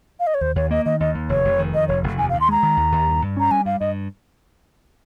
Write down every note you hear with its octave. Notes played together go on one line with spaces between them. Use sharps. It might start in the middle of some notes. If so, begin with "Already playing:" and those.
F5
D#5
C#5
D#2 C5
D#2 C#5
A#3 D#5
D#3 D#5
D#2 D#5
D#2
F1 C#5
F1
D#3
F2 D#5
F1 C#5
F1
D#2 G#5
F5
D#2
C6
G#3 A#5
D#3
D#2
D#2
G2
G2
C#4 A#5
G3 G#5
G2 F5
G2 D#5